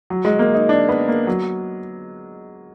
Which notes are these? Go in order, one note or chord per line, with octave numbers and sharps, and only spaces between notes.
F#3
G#3
A#3
D#4
D4
B3
A#3
F#3